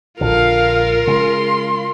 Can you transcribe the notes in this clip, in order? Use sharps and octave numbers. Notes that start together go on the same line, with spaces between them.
A#1 A#2 D3 F4 A#4 F5
C#3 G#3 C6